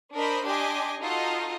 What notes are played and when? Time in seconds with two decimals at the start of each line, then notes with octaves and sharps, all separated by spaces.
0.13 D4 A#4 C5 D#5 B5
0.44 D4 G4 D#5 G#5 C6 D6
1.00 D#4 F4 F#4 A4 D#5 F6